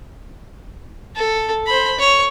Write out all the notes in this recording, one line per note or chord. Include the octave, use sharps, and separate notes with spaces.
A4
C5 B5
C#5